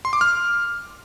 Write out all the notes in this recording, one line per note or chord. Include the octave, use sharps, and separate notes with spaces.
C6
D6
F6